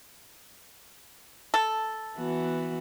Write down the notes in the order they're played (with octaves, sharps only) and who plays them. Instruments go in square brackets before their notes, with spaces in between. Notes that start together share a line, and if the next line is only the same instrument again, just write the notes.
[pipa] A4
[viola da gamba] E3 B3 F#4